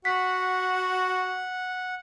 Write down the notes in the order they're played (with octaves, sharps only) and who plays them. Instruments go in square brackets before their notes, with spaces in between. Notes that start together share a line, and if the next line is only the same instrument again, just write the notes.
[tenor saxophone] F#4 [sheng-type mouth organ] F#5 [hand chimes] B6